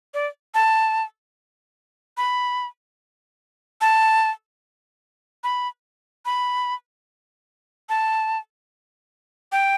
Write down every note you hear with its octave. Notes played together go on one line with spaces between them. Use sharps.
D5
A5
B5
A5
B5
B5
A5
G5